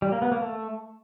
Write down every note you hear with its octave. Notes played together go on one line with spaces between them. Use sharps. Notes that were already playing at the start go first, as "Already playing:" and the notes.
G3
A#3
B3
A#3
A3